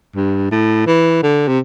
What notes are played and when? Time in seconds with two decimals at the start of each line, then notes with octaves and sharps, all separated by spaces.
0.15 G2
0.51 A2
0.87 E3
1.23 D3
1.48 C3